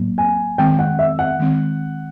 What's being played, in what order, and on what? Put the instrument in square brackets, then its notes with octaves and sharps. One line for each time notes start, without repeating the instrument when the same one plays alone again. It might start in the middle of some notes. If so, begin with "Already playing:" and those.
Already playing: [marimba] A2 F#3 A#3
[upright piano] G#5
[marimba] D#3 G#3 C4 [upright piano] G5
[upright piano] F#5
E5
F#5
[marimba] D#3 G#3 C4